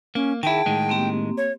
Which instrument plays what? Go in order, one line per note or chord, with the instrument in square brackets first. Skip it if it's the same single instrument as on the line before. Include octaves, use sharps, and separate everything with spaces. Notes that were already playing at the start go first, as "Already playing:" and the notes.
[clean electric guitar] A#3 [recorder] C#4
[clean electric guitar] D#3 E4 [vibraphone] G#4 F#5 A5 [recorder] G5
[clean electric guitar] A2 D#3 G#3
[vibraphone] A#3 C4 G4
[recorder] C#5